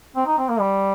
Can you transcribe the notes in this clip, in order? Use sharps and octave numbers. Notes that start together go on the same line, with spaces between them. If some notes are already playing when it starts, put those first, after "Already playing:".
C4
D#4
C4
A#3
G3